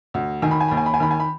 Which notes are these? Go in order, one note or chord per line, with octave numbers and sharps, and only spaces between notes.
D2
D#3 G#5
B5
G#5
D#2 B5
G#5
B5
G#5
D#3 B5
G#5
B5